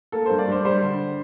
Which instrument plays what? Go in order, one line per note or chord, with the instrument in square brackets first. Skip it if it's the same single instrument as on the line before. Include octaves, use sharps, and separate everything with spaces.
[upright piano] A#3 A4
G2 C5
D5
G2 C5
G3 C5
D3